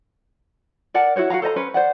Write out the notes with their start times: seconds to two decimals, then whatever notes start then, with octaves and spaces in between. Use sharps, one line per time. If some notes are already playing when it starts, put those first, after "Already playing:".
0.94 A#4 D5 F#5 A5
1.16 E4 F#4 C5 C#5
1.30 F#4 A#4 F5 A#5
1.42 A4 C5 D#5 A#5
1.56 C#4 B4 C5
1.74 C5 D5 F#5